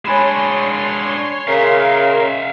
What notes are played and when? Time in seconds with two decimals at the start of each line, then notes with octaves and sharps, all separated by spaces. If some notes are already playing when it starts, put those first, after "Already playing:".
0.05 G#3 D4 C#5 G#5 B5 C6 E7
1.48 C#3 A#4 E5 F5 C6